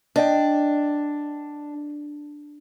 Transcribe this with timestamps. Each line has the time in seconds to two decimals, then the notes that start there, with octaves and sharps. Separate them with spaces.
0.16 D4 D#5 G5